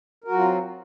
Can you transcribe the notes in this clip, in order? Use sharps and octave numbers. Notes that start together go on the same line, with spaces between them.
F#3 C4 F4 F#4 A#4